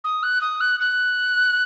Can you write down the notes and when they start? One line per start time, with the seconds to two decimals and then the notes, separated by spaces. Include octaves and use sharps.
0.04 D#6
0.23 F#6
0.41 D#6
0.61 F#6
0.80 F#6